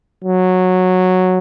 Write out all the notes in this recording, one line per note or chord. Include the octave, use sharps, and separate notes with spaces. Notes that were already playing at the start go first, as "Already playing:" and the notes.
F#3